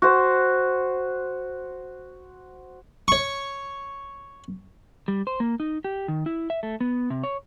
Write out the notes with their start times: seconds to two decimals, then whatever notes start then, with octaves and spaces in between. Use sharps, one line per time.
0.02 F#4 C5
3.08 C#5 C#6
5.08 G3
5.27 C5
5.40 A#3
5.60 D#4
5.85 G4
6.08 D#3
6.26 E4
6.50 E5
6.63 A3
6.81 B3
7.10 C3
7.23 C#5